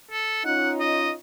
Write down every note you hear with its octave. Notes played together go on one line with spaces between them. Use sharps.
A4
C#4 D#4 F4 F#5
D#5